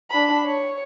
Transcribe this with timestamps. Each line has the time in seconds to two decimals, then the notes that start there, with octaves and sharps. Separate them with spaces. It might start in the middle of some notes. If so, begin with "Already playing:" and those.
0.11 D4 B5
0.46 C#5